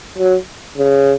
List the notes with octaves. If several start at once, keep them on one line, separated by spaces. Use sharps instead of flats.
F#3
C#3